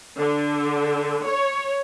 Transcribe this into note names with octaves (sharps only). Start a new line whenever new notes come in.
D3
C#5